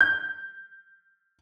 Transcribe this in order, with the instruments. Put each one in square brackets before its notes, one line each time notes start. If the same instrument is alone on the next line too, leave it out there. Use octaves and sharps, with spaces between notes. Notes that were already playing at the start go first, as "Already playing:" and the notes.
[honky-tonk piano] G6